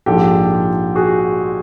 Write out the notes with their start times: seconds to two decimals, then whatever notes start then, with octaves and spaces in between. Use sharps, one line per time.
0.06 A#1 G#2 F3 G4 A4
0.96 F#4 G#4